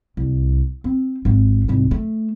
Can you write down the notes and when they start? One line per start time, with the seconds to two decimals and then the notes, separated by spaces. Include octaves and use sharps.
0.17 C2
0.84 C4
1.25 G#1 F4
1.68 C2 G#2
1.91 A3